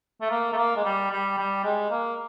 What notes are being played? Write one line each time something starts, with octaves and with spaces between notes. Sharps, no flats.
A3
A#3
A3
A#3
G#3
G3
G3
G3
G#3
A#3